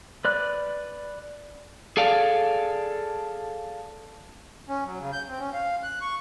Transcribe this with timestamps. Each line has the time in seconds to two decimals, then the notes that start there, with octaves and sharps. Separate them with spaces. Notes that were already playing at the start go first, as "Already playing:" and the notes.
0.25 B4 D5 F#6
1.97 G#4 A4 D5 F5
4.69 C#4
4.86 F#3
4.99 C#3
5.13 G6
5.28 C4
5.39 C#4
5.53 F5
5.83 F#6
6.01 C#6